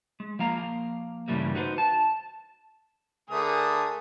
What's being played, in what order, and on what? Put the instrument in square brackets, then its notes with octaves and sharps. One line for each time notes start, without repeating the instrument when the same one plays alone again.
[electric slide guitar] G#3
F3 A#3 F5 A#5
G2 C#3 E3 G3 A3 A#3
D#4 F#4 B4 C5
A5
[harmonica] D3 A3 D#6 [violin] G#4 A#4